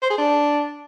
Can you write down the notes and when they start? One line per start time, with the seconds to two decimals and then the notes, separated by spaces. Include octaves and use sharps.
0.02 C5
0.10 G#4
0.18 D4